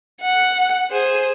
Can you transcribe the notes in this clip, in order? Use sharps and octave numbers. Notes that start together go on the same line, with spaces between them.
F#5
G#4 C5